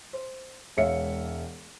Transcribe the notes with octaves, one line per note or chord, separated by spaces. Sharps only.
C5
E1 G#3 C#5 E5 F5 C#7